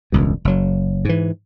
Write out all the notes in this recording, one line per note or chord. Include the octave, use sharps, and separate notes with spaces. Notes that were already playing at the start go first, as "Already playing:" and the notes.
E1 C#2 G2
F#1 F#3
G#2 E3